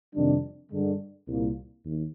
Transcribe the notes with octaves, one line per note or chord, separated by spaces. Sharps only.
F2 C3 D#3 G3 D4
G2 D3 G#3 D4
C2 A#2 G3 A#3
D#2